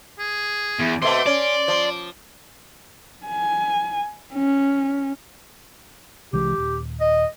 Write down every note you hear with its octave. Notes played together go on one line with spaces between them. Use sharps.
G#4
E2
B2 A3 C4 C6 D6
C#4 D5
F3
G#5
C#4
C2 E3 G#3 G4
D#1
D#5